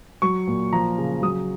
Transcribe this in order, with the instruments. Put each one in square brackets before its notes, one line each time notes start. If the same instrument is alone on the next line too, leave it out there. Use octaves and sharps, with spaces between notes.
[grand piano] F#3 C#6
A#2
F3 A#5
C#3
F#3 D#6